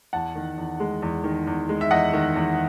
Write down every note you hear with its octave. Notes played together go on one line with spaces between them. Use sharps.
E2 F#5 A5
D#3
E2
G#3
E2
D#3
E2
G#3
E5
E2 D#5 F#5
D#3
E2